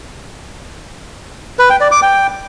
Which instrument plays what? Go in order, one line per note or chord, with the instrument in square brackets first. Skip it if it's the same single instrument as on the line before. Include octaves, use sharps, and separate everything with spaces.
[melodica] B4
G5
D5
D6
G5